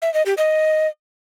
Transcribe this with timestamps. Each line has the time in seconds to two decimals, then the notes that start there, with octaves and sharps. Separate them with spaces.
0.02 E5
0.14 D#5
0.26 G4
0.38 D#5